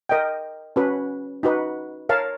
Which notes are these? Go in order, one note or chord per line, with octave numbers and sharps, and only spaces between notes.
A#4 D#5 G5
C#4 F#4 B4
D#4 F#4 B4
A#4 C#5 F5 A5